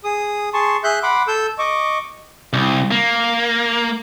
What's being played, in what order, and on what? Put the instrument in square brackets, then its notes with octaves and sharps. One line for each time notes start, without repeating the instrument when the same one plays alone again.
[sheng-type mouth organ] G#4 D#6
G#4 A5 C6 C#6
G#4 E5 F#6 G6
F#5 B5 C6 D6
A4 E6 G6
D#5 C#6 D6
[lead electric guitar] C2
A#3